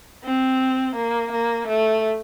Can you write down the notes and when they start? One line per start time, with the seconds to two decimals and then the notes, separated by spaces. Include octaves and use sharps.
0.24 C4
0.96 A#3
1.32 A#3
1.67 A3